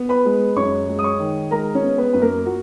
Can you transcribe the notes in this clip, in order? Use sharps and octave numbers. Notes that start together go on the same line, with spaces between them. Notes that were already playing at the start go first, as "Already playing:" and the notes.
Already playing: B3
B4 B5
G#3
F#2 C#5 C#6
G#3
D#6
C#5 C#6
D#3
G#3 A#4 A#5
C#4 C#5
B3
B3 B4
F#2 B4
A#3 A#4
F#4